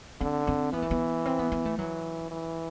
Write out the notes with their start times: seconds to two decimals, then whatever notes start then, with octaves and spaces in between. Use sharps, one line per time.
0.20 D3 C4
0.47 C4
0.73 E3 B3
0.82 A3
0.91 B3
1.25 C4
1.39 B3
1.52 B3
1.65 A3
1.78 E3 F#3
2.31 E3